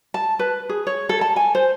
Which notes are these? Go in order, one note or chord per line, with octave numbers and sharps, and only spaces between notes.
A5
B4
G#4
C#5
A4
A5
G#5
C5